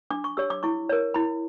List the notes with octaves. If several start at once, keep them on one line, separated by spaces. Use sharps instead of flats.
D4 D6
C#6
G4 C#5 E6
D6
E4 C#6
A#4 C#5
E4 B5